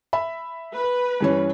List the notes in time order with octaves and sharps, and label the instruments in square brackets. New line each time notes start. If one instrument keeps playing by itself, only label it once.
[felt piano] E5 B5
[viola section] B4
[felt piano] G2 E3 C#4